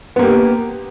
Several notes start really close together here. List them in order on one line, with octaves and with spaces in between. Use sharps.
B3 A#3 G4